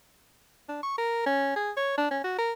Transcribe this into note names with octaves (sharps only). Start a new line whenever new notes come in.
D4
C#6
A#4
C#4
G#4
C#5
D4
C#4
F#4
A#4